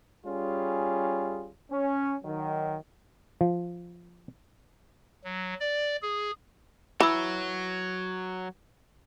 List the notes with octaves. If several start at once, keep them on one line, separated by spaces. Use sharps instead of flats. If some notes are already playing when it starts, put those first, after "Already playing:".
G3 C#4 F4 G#4
C#4
D#3 F#3
F3
F#3
D5
G#4
E3 F#3 B5 E6